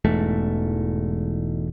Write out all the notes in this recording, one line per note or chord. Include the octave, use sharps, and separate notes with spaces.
E1 E2 G#2 A3